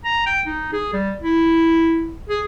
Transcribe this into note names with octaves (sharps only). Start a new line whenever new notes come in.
A#5
G5
D#4
G#4
G3
E4
G#4